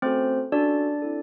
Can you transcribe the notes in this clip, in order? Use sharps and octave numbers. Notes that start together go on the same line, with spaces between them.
A3 C4 C#4 F#4 A4 C5
C#4 D4 F#4 A4 D5
C4 E4 A4